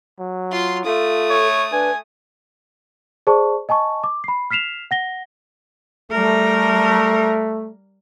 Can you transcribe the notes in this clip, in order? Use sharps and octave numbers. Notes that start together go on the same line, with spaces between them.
F#3
F4 C6
A3 F4 A4 D#6
C#5
D4 B4 G#5
G#4 C5 D5 A5 C#6
D#5 G#5 A5 C#6
D6
B5 C7
F6 B6 C7 E7 F7
F#5 A#6 G7
G3 A3 A#4